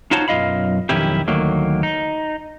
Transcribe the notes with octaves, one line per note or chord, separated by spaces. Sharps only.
D#4 F4 F#4 C5 C#5 A5
B1 F#2 F4 D#5 F5 B5
B1 F2 D#3 C#4 E4 G4
D2 D#3 F#3 A#3
D#4